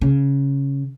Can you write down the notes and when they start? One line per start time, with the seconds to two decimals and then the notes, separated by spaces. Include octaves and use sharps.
0.01 C#3